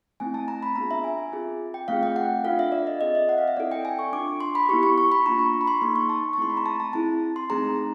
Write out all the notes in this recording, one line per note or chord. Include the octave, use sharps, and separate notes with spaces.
A3 C4 E4 G#5
A5
A#5
B5
B3 D4 F4 G#4 A#5
E5
G#5
C4 F4 G#4
G5
A3 C4 F4 G#4 F5
G5
F#5
D4 F4 A4 F5
E5
D5
D#5
C4 F4 G#4 D#5
E5
F#5
F5
E5
C4 E4 A4 D5
G5
G#5
C#6
D4 F4 A4 D6
C6
B5
B3 E4 G4 C#6
C#6
C#6
B5
A#3 D4 F4 A#5
C#6
C#6
B5
C6
A#3 D#4 G#4 C6
C#6
A5
C#6
A3 C4 E4 G#4 C6
B5
A#5
A5
A5
C4 E4 G#4 A5
C6
A3 C4 D#4 G#4 A#5